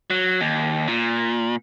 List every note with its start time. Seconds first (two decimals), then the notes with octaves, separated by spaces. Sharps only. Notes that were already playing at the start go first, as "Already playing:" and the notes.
0.10 F#3
0.41 D#2
0.88 A#2